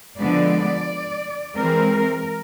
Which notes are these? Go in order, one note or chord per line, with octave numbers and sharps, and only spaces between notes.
D3 F3 G#3 B3 D5
E3 G#3 C4 A#4